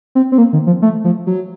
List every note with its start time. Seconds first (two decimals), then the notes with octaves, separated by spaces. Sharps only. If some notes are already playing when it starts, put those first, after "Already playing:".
0.15 C4
0.32 C4
0.38 A#3
0.53 D#3
0.67 F3
0.82 A3
1.04 F3
1.27 F#3